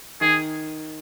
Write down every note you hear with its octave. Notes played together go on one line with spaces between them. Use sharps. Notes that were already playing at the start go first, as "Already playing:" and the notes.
D#3 G#4